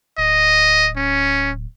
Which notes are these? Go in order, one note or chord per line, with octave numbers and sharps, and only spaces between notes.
D1 D#5
C#4